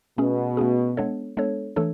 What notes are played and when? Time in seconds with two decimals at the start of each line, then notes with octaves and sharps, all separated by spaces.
0.18 B2 A3 C#4 G#4
0.57 A3 C#4 G#4
0.97 G#3 B3 D4 A4 C#5
1.37 G#3 B3 D4 A4 C#5
1.76 E3 A3 D4 A4 C#5